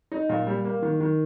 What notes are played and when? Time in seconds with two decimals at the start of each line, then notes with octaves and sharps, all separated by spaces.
0.12 D#4
0.29 A#2
0.47 G3
0.65 A#3
0.82 D#3
1.00 D#3